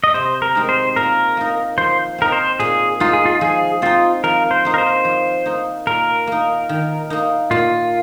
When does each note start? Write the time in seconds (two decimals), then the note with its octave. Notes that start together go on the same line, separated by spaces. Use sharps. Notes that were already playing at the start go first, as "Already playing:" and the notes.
0.04 D#5
0.14 C3 C5
0.42 A#4
0.55 G#3 C4 D#4
0.69 C5
0.96 A#2 A#4
1.37 A#3 D#4
1.78 F3 C5
2.18 C4 D#4 A#4
2.32 C5
2.60 A#2 G#4
3.00 G#3 D#4 F4
3.13 G#4
3.26 F4
3.41 F3 G#4
3.82 C4 D#4 F4
4.24 F3 A#4
4.51 C5
4.65 A#3 D#4
4.74 A#4
4.78 C5
5.05 F3
5.46 A#3 D#4
5.87 A#2 A#4
6.27 A#3 D#4
6.69 D#3
7.10 A#3 D#4
7.51 A#2 F4